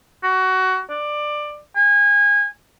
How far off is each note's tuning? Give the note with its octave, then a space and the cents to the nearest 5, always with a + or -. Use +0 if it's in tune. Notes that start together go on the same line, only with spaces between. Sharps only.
F#4 +20
D5 +15
G#5 -25